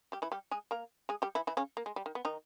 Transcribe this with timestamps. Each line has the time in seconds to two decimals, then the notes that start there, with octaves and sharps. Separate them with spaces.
0.12 G3 G4
0.22 E3 E4
0.32 G3 G4
0.51 G#3 G#4
0.71 A#3 A#4
1.09 G#3 G#4
1.22 G3 G4
1.35 E3 E4
1.47 E3 E4
1.57 C#3 C#4
1.77 A#3
1.86 G#3
1.96 G3
2.06 D#3
2.15 B3
2.25 D#3 D#4